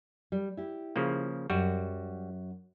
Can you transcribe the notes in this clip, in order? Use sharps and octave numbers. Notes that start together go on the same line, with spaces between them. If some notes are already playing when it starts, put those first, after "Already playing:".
G3
E4 G4
C#3 F3 A#3
F#2 G3 F#4